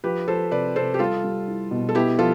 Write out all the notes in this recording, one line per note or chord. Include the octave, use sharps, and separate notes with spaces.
F3 G4 B4
F3 A4 C5
C3 B4 D5
C3 A4 C5
G4
G3 F4 A4
G3
E4
B2
A4
B3 E4 G4
F3 F4 A4